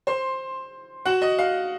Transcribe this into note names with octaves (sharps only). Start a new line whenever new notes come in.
C5 C6
F#4 F#5
D#5
F5